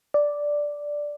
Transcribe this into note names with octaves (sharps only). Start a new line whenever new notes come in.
D5